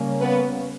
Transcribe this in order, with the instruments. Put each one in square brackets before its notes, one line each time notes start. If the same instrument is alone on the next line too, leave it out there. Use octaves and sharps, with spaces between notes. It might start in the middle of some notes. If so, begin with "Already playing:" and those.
Already playing: [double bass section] C#3 G3 A#3 C#4
[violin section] B3 B4